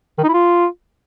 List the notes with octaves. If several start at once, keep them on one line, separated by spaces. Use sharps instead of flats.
D#3
D#4
E4
F4